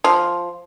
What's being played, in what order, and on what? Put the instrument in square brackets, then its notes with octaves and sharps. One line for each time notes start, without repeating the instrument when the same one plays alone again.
[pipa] F3